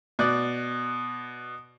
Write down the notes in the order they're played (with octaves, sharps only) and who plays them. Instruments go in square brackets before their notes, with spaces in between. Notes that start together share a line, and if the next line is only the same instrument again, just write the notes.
[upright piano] B2 D5 F#6